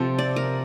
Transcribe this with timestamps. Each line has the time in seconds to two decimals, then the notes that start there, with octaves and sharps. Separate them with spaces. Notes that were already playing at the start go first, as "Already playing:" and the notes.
Already playing: C3 F3 C4 A4
0.19 D5
0.36 A#4